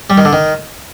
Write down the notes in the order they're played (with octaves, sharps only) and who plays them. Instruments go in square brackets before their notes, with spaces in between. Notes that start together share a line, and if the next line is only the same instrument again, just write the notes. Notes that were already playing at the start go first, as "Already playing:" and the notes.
[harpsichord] G3
D#3
D3
D#3